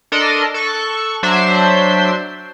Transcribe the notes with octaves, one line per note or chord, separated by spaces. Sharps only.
D4 A4 A#4 D#5 C6
A4 C#6 F#6
F#3 D4 C5 E5 C6 C7